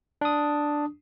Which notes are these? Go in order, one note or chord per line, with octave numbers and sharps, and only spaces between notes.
D4 D#6